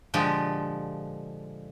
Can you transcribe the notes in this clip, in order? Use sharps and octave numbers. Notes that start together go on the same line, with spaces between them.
A#2 D3 F3 G#3 G4